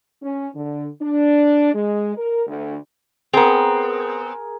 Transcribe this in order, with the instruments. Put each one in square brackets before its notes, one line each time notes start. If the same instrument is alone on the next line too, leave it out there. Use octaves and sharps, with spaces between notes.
[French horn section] C#4
D3
D4
G#3
A#4
D2
[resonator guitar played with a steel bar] B3 C4 [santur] G#4 A#4